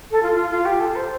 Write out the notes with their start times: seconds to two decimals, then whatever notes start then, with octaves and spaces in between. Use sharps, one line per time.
0.11 A4
0.23 F4
0.34 F4
0.50 F4
0.65 G4
0.80 A4
0.96 C5